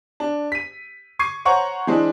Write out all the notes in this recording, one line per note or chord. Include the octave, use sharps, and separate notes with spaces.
D4
B6 D#7
C#6 D6 G#6 C7 D#7
C5 C#5 F#5 A#5 C#6
E3 G#3 C4 D4